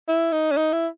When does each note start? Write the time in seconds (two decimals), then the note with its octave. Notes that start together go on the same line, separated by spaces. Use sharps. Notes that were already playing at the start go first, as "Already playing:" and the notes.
0.08 E4
0.32 D#4
0.51 C#4
0.57 D#4
0.73 E4